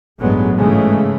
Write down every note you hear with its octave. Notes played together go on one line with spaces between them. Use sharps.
A1 G2 F#3 G#3 B3
G#2 C#3 E3 G#3 A3